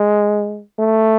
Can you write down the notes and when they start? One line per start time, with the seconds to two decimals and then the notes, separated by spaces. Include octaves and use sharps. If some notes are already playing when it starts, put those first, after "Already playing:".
Already playing: G#3
0.79 A3